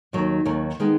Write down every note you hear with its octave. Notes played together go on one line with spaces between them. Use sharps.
D#2 D#3 F#3
D#2 D#3 F#3
D#3 G#3 B3